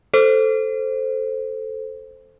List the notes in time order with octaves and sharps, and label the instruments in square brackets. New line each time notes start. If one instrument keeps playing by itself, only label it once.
[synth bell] A4 C5